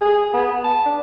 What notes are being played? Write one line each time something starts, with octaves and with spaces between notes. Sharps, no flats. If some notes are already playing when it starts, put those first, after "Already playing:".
G#4
B3
A5
D4